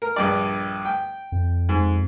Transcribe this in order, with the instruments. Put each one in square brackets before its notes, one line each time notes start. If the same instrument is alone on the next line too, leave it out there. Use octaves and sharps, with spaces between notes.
[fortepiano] A#4
A#1 G2 D5
G5
[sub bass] F2
[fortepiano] G#2